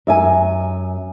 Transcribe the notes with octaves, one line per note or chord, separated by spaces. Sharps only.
F#2 E5 G#5